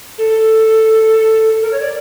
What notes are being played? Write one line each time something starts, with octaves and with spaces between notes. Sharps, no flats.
A4
A#4
C#5
D5